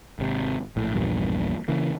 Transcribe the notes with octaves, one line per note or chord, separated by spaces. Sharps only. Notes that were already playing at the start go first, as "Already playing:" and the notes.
G#1 C3
A#1 A2
A#1 E2 G2 A#2
C#3 E3 A#3